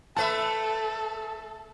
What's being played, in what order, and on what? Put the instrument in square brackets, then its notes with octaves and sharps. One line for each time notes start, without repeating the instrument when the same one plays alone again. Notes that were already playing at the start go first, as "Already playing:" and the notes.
[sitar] A3 B4 E5 [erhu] A4 [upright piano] A5